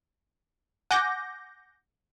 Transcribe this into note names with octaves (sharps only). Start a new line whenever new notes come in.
F#5 G#5 D6 G6 A#6